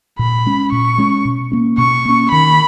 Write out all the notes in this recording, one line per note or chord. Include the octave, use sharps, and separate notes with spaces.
A#2 B5
G#3 C#4
A#2 C#6
G#3 C#4
B2
A#3 C#4
B2 C#6
A#3 C#4
D#3 B5